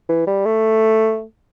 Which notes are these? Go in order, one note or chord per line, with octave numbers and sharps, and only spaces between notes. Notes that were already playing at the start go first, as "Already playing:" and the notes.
E3
G3
A3